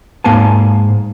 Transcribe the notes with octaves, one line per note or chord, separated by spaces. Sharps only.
G#2 A#3 F5 G#5 A5